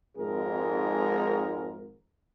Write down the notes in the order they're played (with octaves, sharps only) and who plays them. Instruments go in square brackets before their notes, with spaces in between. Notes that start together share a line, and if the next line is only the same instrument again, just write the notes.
[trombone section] G#1 F2 G#2 G#4 A#4